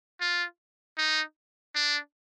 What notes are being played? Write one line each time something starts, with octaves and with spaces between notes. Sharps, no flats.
F4
D#4
D4